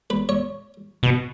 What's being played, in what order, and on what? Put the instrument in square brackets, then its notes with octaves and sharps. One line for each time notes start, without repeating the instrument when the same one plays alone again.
[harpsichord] B4
C#5
[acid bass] B2